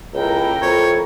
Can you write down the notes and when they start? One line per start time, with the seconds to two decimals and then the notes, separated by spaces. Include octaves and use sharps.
0.14 C#2 A#3 E4 A4 A#4 G5
0.62 F2 C#5